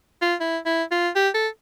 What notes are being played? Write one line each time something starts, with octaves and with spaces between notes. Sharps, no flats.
F4
E4
E4
F4
G4
A4